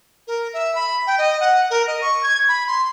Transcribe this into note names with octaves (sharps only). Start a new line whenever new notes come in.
A#4
E5
B5
G5
D#5
F#5
A#4
D#5
C#6
G#6
B5
C6